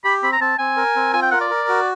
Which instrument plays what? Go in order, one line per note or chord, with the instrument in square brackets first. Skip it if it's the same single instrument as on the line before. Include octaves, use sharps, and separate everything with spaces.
[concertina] G4 [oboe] B5
[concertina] C4 [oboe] B5
[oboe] A#5
[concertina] C4 [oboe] A5
[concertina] C4 [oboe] G#5
[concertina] A#4
C4
[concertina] F4 [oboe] G#5
[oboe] G5
[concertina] A#4 [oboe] F#5
[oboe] D5
[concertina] A#4
F#4